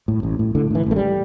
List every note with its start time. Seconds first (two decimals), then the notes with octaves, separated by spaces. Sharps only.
0.08 A2
0.23 A1
0.39 A2
0.55 A2 D3
0.70 A2 E3
0.87 A1 A3
0.96 G3